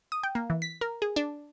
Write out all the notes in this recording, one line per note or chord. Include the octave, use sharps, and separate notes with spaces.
D#6
G5
A#3
E3
B6
A#4
G#4
D4